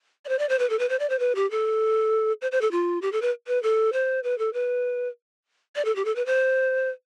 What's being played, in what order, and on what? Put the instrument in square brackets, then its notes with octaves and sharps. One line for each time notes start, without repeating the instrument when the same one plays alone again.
[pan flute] D5
C5
D5
C5
B4
A4
B4
C5
D5
C5
B4
G4
A4
C5
C5
A4
F4
G4
A4
B4
B4
A4
C5
B4
A4
B4
D5
A4
G4
A4
B4
C5